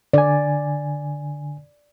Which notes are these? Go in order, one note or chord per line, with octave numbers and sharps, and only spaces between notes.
D3 D5 G#5